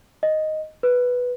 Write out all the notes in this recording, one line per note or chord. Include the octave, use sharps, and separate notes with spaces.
D#5
B4